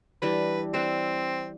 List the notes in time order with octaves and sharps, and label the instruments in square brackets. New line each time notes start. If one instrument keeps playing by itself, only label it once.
[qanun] E3 G3 D4 [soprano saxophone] B4
[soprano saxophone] C4 [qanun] B4 E5